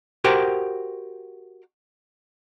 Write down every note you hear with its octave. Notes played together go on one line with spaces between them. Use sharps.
F#4 G4 A#4 C5 F#5 G5